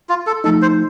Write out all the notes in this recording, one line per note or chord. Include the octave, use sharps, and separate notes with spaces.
F4
A4
F3 A3 D#4 A4
C5